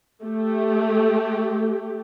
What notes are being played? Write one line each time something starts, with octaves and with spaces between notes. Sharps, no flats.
A3 G4